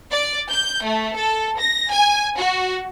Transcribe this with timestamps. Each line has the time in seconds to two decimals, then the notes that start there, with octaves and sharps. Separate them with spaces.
0.11 D5
0.51 G6
0.84 A3
1.16 A4
1.59 A#6
1.91 G#5
2.37 F#4